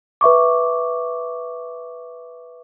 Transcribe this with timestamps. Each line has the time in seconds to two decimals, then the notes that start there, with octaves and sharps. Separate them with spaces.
0.21 B4 E5 C#6 D6